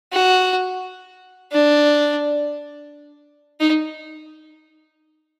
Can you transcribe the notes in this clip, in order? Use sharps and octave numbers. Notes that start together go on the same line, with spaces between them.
F#4
D4
D#4